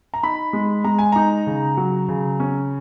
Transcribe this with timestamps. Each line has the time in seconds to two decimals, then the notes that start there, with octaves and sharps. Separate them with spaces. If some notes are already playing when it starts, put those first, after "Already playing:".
0.14 A#5
0.23 D#4 B5
0.53 G#3
0.84 G#3 A#5
0.99 G#5
1.12 D#4 A#5
1.47 C#3
1.77 F#3
2.08 C#3
2.40 C#4